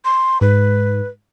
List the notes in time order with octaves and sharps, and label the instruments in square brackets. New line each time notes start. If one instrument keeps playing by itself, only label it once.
[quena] C6
[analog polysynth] G#2 [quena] B4